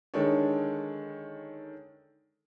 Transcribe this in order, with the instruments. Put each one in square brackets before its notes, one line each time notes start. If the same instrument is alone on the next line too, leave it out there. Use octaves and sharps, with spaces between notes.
[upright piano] D3 D#3 G#3 D4 A4 C#5